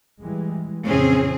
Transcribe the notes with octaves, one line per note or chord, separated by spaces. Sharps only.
E3 G3 G#3
F2 A#2 C#3 E3 C4 C#4 G#4